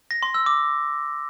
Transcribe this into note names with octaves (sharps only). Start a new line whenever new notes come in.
A#6
C6
E6
D6